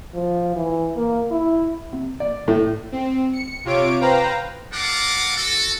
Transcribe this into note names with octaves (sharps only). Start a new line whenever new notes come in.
F3
E3
A#3
E4
C3
D5
A2
C4
C#7
C3 F4 C#5 D6 D7
B4 C5 F5 G5 A#5
D4 A4 A#4 F5 F#5 D6
F#4 A4